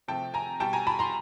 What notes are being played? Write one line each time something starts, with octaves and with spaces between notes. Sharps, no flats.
C3 F3 A3 G5 A5
G#5 A#5
B2 G3 G5 A5
G#5 A#5
A5 B5
A#5 C6